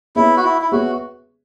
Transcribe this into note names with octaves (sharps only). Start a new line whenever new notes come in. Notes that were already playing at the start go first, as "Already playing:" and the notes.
B3 E4 G#4 C#5 E5
F#4
E4
E4
B3 F#4 G#4 C#5 E5